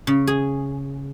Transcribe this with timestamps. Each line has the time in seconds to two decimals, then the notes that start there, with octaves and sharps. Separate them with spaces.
0.07 C#3
0.27 G#4